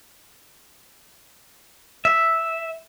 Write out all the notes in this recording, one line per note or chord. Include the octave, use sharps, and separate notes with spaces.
E5